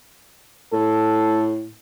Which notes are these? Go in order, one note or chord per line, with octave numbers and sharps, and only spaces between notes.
A2 A4